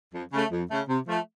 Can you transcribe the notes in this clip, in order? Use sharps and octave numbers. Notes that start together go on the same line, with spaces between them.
F2
C#3 A3
F2
C#3 A3
C3
F3 A3